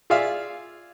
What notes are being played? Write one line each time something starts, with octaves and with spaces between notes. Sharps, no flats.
F4 G#4 D5 E5 F5